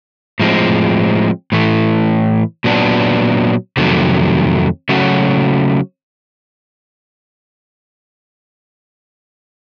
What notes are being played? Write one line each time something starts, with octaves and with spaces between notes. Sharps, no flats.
A2 F3 G#3 C4
A2 E3 A3
A#2 F#3 B3 D4
F2 C3 D#3 F#3 A3
C#3 F#3 A3 C#4 F#4